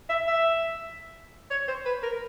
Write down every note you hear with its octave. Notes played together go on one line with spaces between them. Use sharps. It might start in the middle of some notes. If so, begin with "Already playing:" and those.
E5
E5
C#5
C5
B4
A#4